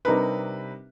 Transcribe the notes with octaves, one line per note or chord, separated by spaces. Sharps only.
C3 G3 D4 D#4 A#4 B4